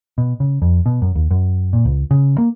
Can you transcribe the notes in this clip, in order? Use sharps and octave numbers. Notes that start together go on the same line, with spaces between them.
B2
C#3
F2
B2
F#2
D#2
F#2
A#2
C#2
C#3
A#3